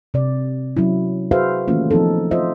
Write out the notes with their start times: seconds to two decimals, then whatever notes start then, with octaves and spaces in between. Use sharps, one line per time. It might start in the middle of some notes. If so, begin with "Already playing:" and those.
0.14 C3 D5
0.77 F#3 C#4 E4
1.31 F#4 G#4 B4 C5 E5 F5
1.68 D#3 E3 A3 A#3 C#4 F4
1.91 F3 B3 C4 D#4 A4
2.31 F4 C5 D#5 E5